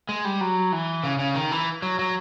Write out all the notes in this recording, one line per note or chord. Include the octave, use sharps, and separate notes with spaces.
G#3
G3
F#3
E3
C#3
C#3
D#3
E3
F#3
F#3